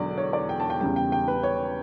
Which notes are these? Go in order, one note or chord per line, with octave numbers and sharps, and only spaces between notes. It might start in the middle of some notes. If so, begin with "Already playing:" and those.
Already playing: E1 E2 D3 F#3 D5
C#5
D5
G5
A5
G5
E2 C#3 G3 G5
G5
G5
B4
C#5